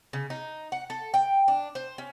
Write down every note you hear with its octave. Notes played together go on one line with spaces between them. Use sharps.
C#3
D#4
F#5
A4
G5
D4
C5
C#4